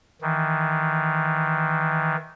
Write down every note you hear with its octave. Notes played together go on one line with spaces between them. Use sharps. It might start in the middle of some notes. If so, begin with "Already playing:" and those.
D#3 E3